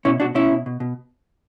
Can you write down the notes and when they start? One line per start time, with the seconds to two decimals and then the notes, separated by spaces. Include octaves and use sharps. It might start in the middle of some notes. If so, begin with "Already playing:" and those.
0.05 B2 C#4 E4
0.20 B2 D4 F#4
0.35 B2 C#4 E4
0.51 B2
0.66 B2
0.80 B2